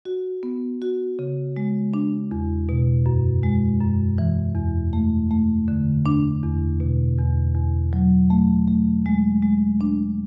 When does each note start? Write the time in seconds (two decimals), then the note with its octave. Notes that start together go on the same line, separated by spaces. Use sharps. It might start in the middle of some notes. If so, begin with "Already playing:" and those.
0.05 F#4
0.43 B3
0.82 F#4
1.19 C#3
1.57 G#3
1.94 D4
2.31 E2
2.69 B2
3.06 F#2
3.43 G#3
3.81 F#2
4.18 E3
4.55 E2
4.93 A3
5.31 A3
5.68 D3
6.06 D4
6.43 E2
6.80 B2
7.18 E2
7.55 E2
7.93 F#3
8.30 A3
8.67 A3
9.06 G#3
9.43 G#3
9.81 D4